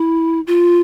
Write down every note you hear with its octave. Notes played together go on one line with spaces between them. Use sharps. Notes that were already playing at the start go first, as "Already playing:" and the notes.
Already playing: E4
F4